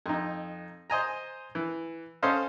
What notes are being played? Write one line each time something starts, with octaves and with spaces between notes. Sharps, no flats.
F2 D#4
C5 D#5 G#5 A#5
E3
C#4 A4 C5 D#5 F5